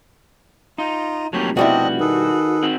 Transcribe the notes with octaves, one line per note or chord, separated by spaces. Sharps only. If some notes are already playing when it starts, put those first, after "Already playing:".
D#4 F4 A#5
F1 F#3 A#3 G4 C#5 A5
B2 G3 C4 D4 E4 F#4 D#5
D#3 G#4 A4 B4
C4 F#4